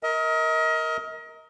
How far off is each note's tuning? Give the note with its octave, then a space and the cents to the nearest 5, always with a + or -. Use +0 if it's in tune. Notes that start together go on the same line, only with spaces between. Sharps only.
A#4 +0 D#5 +35